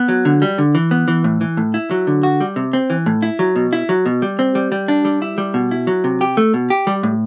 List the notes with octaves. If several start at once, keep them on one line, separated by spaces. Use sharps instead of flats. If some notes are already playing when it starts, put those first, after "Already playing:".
Already playing: B3
F#3
D3
G3
D3
E3
B3
E3
A2
E3
A2
E4
F#3
D3
F#4
G3
C3
C4
E3
A2
E4
F#3
B2
E4
F#3
B2
G3
C4
G3
G3
D4
G3
E4
G3
B2
E4
F#3
C3
G4
A3
B2
G4
G3
A2